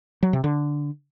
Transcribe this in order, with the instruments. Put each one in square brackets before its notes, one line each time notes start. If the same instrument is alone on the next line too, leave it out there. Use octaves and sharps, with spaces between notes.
[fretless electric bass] F#3
C3
D3